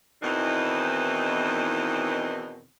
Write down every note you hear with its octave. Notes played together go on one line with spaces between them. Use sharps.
E2 B2 D#3 E3 C4 D#4